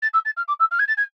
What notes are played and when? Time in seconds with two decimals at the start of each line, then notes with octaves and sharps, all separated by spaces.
0.02 A6
0.14 E6
0.25 A6
0.37 F6
0.48 D6
0.60 E6
0.71 F6
0.79 G#6
0.88 A6
0.97 G#6